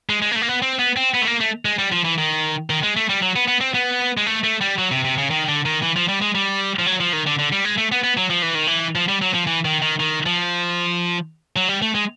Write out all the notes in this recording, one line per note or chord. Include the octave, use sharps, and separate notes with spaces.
G#3
G#3
A#3
A3
A#3
B3
C4
B3
C4
B3
A3
A#3
A3
G#3
G3
F3
E3
D#3
D#3
G#3
A3
G3
F#3
B3
B3
C4
B3
G#3
A3
A3
G3
F#3
C3
C3
C#3
D#3
D3
D#3
E3
F3
G3
G#3
G3
F3
F#3
F3
D#3
D3
D3
G3
G#3
A3
B3
B3
F#3
F3
E3
D#3
E3
F3
G3
F#3
F3
E3
D#3
D#3
D#3
F3
F#3
G3
A3
G#3